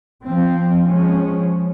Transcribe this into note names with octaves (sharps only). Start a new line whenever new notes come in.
F3 C4
F3 G#3 C#4